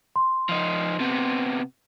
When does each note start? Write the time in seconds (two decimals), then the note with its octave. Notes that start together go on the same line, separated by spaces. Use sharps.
0.16 C6
0.49 F3 D#4
1.00 C3 B3